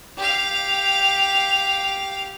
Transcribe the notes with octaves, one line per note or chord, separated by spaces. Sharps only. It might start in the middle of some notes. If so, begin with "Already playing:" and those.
G4 F5